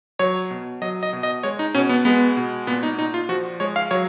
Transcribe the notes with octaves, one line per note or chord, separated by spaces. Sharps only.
F#3 C#5
B2
F#3 D#5
D#5
B2
D#5
G#3 C#5
D#4
B2 C#4
B3
G#3 B3
B2
A#2 B3
D#4
A#2 D#4
F4
F3 F#4
G#3 C#5
F5
F#3 C#5